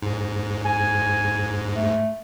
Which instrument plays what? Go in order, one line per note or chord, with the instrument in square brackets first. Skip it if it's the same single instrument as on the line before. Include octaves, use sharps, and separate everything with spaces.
[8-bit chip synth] G#2
[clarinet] G#5
A3